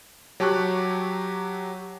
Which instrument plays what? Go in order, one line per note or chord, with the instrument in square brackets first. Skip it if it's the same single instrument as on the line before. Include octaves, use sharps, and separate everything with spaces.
[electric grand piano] F#3 G4 A5 C#6 F#6